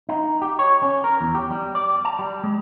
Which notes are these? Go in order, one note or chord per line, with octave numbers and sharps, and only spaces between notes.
D#4
G4
C#5
C#4
A#4
E2
G4
G3
D5
A5
G3
G#3